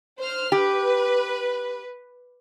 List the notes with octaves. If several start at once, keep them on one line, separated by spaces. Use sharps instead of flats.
C5 F6
G4 B4